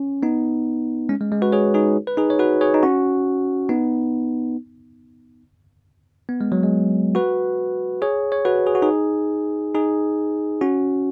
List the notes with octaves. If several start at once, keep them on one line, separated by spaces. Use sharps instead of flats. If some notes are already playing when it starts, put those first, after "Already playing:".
Already playing: C#4
B3 D#4
G#3 C#4
G#3
G#3
F#4 B4
G#4 C#5
D#4 G#4
B4
D#4 G#4
C#5
F#4 B4
G#4 C#5
D#4
C#4 F#4
B3 D#4
B3
G#3
F#3
G#3
F#4 B4
G#4 C#5
C#5
F#4 B4
G#4
F#4
D#4 G#4
D#4 G#4
C#4 F#4